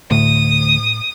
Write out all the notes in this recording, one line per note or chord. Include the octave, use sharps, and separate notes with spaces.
D2 A2 D#6